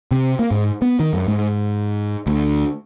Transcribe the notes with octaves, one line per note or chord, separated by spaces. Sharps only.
C3
A#3
G#2
B3
D#3
F#2
G#2
D2